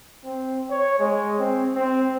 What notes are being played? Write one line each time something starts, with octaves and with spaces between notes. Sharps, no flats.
C4
C#5
G#3
C4
C4